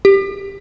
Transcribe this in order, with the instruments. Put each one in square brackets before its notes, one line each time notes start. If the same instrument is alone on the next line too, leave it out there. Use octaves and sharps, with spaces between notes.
[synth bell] G4